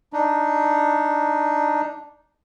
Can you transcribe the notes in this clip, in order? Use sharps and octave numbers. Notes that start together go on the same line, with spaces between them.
D4 D#4